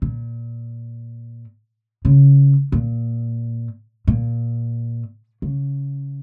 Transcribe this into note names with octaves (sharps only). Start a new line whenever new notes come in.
A#2
C#3
A#2
A#2
C#3